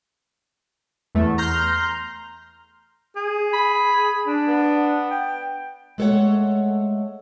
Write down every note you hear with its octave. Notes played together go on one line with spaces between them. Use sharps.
E2 A3
A#5 C6 F6 G6
G#4
B5
D4
B3
G5
G#3 A3 A4 C5 C#5 F#5